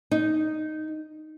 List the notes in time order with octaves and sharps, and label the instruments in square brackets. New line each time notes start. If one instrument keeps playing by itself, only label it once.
[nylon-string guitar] D#4